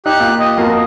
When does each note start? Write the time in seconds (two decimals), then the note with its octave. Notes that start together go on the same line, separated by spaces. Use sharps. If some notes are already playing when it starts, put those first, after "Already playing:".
0.06 D#4 G4 F#6
0.20 A#2
0.39 D#5
0.57 F2 A#3 F#4